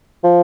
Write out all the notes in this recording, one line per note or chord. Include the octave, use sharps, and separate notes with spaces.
F3